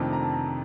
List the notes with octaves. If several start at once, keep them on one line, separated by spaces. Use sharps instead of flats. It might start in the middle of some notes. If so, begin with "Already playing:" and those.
Already playing: F2 C3 D#3 A3 D4
A#5
A5
A#5